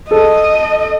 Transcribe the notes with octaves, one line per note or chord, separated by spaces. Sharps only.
A4 D#5